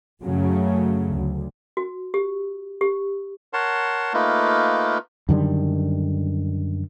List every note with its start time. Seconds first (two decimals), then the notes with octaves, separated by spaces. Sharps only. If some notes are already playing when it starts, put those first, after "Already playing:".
0.23 F#2 C#3 F#3 A3
1.15 D2
1.77 F#4
2.14 G4
2.81 G4
3.53 A#4 C#5 F#5 A5 C6
4.14 A3 A#3 D#4 F4 A#4 B4
5.29 F#2 D3 D#3 G3